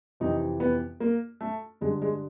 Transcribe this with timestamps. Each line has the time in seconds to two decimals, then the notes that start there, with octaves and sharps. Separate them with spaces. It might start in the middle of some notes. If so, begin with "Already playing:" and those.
0.20 F2 C3 E3 D#4
0.60 B3
1.00 A#3
1.41 A3
1.81 G2 D3 G#3
2.02 G#3